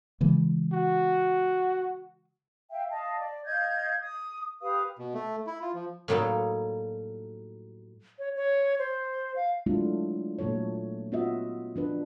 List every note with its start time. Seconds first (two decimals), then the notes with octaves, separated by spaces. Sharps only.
0.21 C#3 E3 G#3
0.73 F#4
2.71 E5 F5 G5
2.90 D#5 F5 A5
3.19 D5
3.45 D#5 F5 G6 G#6
4.00 D#6
4.62 G4 B4 F5 D#6
4.99 B2
5.14 A3
5.47 E4
5.62 F4
5.74 F3
6.08 A2 F#3 G3 A#3 D#4 A4
8.19 C#5
8.36 C#5
8.79 C5
9.36 F5
9.66 F#3 G#3 A3 D4 E4 F4
10.39 A#2 F#3 A3 A4 C#5
11.12 B3 C#4 F4 F#4 D#5 E5
11.76 F3 D4 B4